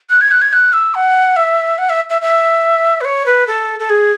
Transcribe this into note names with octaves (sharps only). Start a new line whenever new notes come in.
F#6
G#6
F#6
G#6
F#6
E6
F#5
E5
F#5
E5
E5
E5
B4
C#5
B4
A4
A4
G#4